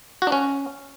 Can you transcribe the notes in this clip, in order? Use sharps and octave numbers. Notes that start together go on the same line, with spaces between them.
F#4
D4
C#4